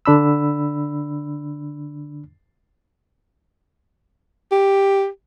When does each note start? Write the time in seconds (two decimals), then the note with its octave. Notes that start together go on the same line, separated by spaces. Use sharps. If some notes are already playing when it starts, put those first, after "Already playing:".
0.06 D3 D4 B5 E6
4.52 G4